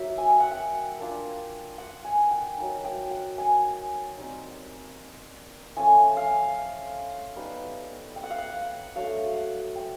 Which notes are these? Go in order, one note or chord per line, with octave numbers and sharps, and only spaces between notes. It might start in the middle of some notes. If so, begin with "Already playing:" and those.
Already playing: F#3 A#3 D#4 E5
G#5
G5
F#5
G5
A#3 D4 F4
F#5
G#5
G5
F#3 A#3 D#4
G5
F#5
G#5
G3 C4 D#4
F3 A3 C#4 F4 G#5
F5
G3 B3 D#4
G5
F#5
F5
F#5
F#3 A3 D4 F5
F#5
G5